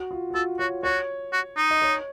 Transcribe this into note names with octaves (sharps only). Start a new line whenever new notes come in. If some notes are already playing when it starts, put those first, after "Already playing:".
Already playing: F#4
F4
F#4
F4 A4
F#4 C#5
F#4 C#5
F#4
D#4
D#5
C#5